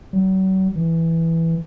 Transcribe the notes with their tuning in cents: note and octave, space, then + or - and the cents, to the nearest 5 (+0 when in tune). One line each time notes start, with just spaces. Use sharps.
F#3 +40
E3 +0